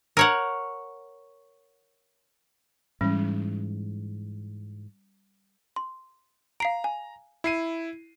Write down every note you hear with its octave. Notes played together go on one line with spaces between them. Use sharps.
A#4 C#5 F#5
G#2 E3 G3 C#4
C6
F5 A#5 C7 D7
G#5
E4 C7 D#7